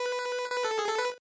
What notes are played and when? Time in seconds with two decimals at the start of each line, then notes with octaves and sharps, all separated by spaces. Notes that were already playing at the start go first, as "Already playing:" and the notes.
Already playing: B4
0.50 B4
0.65 A4
0.79 G#4
0.89 A4
0.98 B4